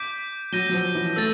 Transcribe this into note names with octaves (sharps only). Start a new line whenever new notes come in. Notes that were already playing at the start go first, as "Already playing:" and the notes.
Already playing: D6 G6 B6 D7
F#3 G6 A#6 D#7 G7
F#3
F3
E3
A3 E6 A6